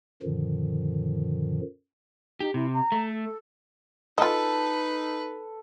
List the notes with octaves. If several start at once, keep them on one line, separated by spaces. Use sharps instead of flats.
F#2 A#2 D3 D#3 F3
D#4 G4
C3 E4
A#5
A3
A4
D#4 F4 A4 B4 D#5 A5